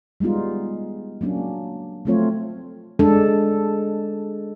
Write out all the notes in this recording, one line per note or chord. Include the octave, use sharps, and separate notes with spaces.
G3 G#3 B3 D#4 F4
F#3 A#3 C#4 D4
F3 F#3 A3 C4 F4 C#5
G#3 D4 A4